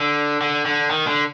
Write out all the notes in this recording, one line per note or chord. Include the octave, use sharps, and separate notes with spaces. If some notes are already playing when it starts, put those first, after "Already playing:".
Already playing: D3
D3
D3
D#3
D3